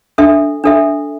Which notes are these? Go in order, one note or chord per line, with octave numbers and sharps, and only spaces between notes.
D4 A4 E5
D4 A4 E5